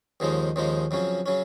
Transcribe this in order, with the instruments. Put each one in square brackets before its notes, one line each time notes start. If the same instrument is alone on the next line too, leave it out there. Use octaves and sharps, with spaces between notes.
[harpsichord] D#2 C#3 F3 G#3 D#4
D#2 C#3 F3 G#3 D#4
F2 C#3 F#3 C#4
C#3 F#3 C#4